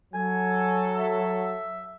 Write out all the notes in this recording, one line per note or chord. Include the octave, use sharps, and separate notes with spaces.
F#3 A4 G#5
E5